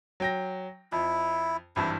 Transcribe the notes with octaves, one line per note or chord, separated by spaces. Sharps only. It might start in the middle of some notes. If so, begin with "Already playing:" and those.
F#3 G5 A#6
F2 E4
G#1 G2 E3 E4